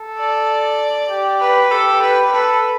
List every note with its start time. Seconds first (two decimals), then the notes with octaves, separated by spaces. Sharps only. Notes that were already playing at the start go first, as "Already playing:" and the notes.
Already playing: A4
0.18 D5
1.10 G4
1.40 B4
1.71 G4 A4
2.02 B4
2.32 A4 B4